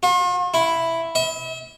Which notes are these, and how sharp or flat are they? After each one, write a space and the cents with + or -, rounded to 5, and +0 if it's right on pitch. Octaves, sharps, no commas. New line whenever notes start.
F4 +45
E4 +0
E5 -35